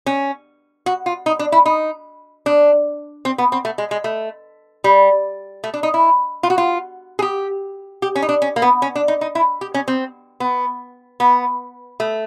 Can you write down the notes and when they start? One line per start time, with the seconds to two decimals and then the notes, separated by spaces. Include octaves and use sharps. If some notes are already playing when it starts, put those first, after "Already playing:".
0.06 C#4
0.86 F#4
1.06 F4
1.26 D#4
1.39 D4
1.52 E4
1.66 D#4
2.46 D4
3.25 C4
3.38 B3
3.52 C4
3.65 A3
3.78 G#3
3.91 G#3
4.04 A3
4.84 G3
5.64 A3
5.74 D4
5.83 D#4
5.94 E4
6.43 F4
6.50 F#4
6.58 F4
7.19 G#4
7.22 G4
8.02 G4
8.15 C#4
8.22 D#4
8.29 D4
8.42 C#4
8.56 A#3
8.62 B3
8.82 C#4
8.96 D4
9.08 D#4
9.21 D#4
9.35 E4
9.61 G4
9.74 C#4
9.88 C4
10.40 B3
11.20 B3
12.00 A3